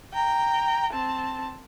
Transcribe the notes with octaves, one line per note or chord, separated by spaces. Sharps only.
G5 A#5
C4 A5